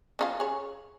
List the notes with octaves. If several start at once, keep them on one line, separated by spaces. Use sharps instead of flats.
C#4 D#4 F4
G#4 C#5